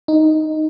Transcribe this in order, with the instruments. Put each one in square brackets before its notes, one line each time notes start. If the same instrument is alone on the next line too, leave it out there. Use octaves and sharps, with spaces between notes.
[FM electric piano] D#4